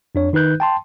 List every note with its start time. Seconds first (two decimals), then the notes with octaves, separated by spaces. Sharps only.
0.15 F2 D4 C#5
0.33 D#3 D#4 B4 F#6 G6
0.60 G5 A5 C6